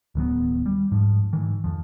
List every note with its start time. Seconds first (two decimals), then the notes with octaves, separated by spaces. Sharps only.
0.15 D1 D#3 F#3 B3
0.66 G3
0.92 G#2 F3
1.33 G#2 D#3 E3
1.64 F2 F3